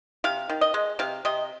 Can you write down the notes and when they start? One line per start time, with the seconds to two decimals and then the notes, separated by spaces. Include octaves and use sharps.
0.24 C3 F5
0.49 D#3
0.61 D#5
0.74 G#3
0.99 C3 F5
1.25 C3 D#5